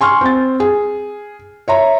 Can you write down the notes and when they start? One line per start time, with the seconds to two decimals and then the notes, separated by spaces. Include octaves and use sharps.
0.01 G#5 C6 C#6 F6
0.21 C4 A6
0.60 G#4
1.68 C#5 E5 A#5